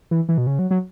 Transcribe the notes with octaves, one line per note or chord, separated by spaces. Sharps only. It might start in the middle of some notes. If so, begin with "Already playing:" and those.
E3
E3
B2
C#3
F#3
F#3